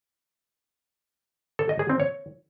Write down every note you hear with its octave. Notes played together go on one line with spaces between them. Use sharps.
A4
D#5
G#4
C4
C#5